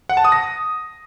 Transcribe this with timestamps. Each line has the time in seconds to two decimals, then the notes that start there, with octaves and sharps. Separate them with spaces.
0.09 F#5
0.17 A5
0.25 D#6
0.32 A#6